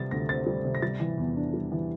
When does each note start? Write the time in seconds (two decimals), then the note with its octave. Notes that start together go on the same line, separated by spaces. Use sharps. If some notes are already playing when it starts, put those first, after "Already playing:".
Already playing: C3 G3 A6
0.11 D2 A#6
0.29 C4 A6
0.46 G3
0.65 C3
0.75 A#6
0.82 G3 A6
1.00 E3
1.18 E2
1.36 D4
1.54 G3
1.72 E3